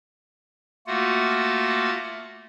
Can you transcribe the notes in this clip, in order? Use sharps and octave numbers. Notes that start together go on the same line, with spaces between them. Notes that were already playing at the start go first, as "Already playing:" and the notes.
A3 A#3 F4 F#4 F#5